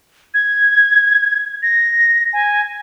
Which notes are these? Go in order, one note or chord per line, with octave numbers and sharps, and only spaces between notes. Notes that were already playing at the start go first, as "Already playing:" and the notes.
G#6
A#6
G#5